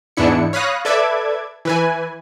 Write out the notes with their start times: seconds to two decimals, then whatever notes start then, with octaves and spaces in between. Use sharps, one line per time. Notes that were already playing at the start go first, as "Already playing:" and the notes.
0.17 E2 G#2 B3 D4 E4 C#7
0.53 C#5 F5 B5 D#6 F#6 A#6
0.85 A4 B4 D5 E5 D6 G#6
1.65 E3 B4 G#5